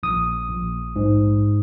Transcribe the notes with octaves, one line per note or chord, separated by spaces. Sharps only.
A#1 D#6
A#1
G#2